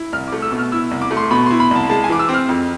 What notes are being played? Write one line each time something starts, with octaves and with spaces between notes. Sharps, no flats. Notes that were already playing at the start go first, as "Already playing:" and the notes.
Already playing: E4
C2 F6
A3 D6
E6
B2
F6
E4 E6
C2
D6
A3
C6
B2 B5
E4 C6
B5
C2 A5
G#3 A5
G#5
E3 D6
E6
C4
F6
F2